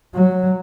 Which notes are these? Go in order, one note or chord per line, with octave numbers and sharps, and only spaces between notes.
F#3